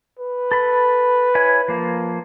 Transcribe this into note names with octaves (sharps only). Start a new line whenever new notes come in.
B4
A4 B5
E4 C#5 G#5
F3 A#3